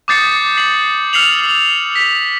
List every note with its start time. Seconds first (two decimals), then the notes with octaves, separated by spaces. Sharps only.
0.08 D6 D#6 G6 A6 C7 C#7
0.57 C7 F#7
1.13 E6 F6 C7 C#7 F7 F#7
1.95 B6